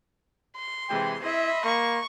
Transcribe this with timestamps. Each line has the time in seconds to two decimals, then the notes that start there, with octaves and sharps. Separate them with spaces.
0.56 C6
0.89 C3 E3 G#3 G5
1.24 E4 D#5 E5 B5 C6
1.64 A#3 C#6